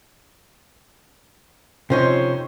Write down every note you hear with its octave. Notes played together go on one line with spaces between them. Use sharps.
F2 C3 C#4 D#4 C5 C#5